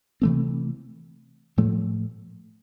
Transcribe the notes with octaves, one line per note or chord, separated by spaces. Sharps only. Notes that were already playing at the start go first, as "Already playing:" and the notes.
C3 E3 A3 C4
A2 F3 A3